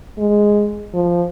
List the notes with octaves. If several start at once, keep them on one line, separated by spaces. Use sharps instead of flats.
G#3
F3